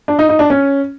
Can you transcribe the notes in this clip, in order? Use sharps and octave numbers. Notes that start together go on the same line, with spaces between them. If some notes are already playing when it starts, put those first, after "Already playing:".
D4
D#4
D#4
D4
C#4